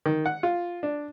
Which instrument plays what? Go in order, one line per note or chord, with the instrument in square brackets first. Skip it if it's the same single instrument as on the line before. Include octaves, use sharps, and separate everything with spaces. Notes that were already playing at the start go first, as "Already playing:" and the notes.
[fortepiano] D#3
F#5
F4
D4